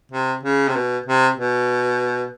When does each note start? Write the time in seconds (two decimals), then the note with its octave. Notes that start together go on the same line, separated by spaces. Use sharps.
0.12 C3
0.43 C#3
0.68 C3
0.76 B2
1.06 C3
1.37 B2